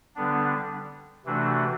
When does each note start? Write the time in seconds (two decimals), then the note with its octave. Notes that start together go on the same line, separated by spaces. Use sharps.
0.16 D3 G3 B3 D4
1.26 C3 E3 A3 D4 F#4